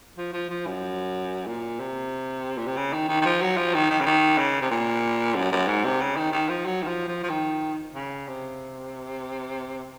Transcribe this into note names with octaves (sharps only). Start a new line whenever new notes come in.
F3
F3
F3
F#2
A#2
C3
A#2
C3
C#3
D#3
D#3
D#3
F3
F#3
F3
D#3
D#3
C#3
D#3
C#3
C3
A#2
F#2
F#2
G#2
C3
C#3
D#3
D#3
F3
F#3
D#3
F3
F3
F3
D#3
C#3
C3